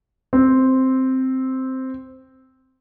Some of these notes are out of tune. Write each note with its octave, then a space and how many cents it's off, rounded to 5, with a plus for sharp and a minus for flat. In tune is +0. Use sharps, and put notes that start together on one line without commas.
C4 +0